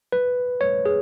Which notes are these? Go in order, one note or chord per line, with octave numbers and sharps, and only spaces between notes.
B4
C#5
G#4